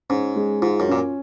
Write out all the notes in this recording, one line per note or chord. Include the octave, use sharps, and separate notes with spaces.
G#2 C#4
G#3
G#2 F4
F#2
A#2 C#4